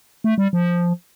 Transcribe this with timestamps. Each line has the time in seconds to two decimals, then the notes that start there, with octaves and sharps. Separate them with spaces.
0.24 A3
0.38 G3
0.53 F3